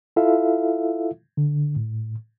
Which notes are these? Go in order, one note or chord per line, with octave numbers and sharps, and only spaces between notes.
E4 F4 A4 E5 F5
D3
A2